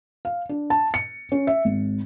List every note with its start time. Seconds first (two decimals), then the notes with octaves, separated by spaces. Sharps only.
0.25 F5
0.49 D4
0.70 A5
0.94 C#7
1.32 C#4
1.47 E5
1.65 G#1